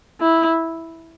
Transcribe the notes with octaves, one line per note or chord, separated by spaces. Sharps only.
E4